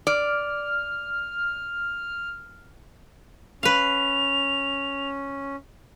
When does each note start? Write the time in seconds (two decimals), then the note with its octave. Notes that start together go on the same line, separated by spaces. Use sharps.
0.07 D5 F6
3.63 C#4 B4 F5 F7